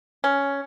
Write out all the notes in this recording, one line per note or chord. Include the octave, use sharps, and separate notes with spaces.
C#4